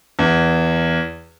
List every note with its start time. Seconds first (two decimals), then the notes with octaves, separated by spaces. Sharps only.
0.19 E2